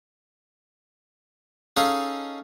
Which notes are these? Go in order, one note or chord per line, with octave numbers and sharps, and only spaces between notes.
C#4 D#4 G#4 A4 D#5 F5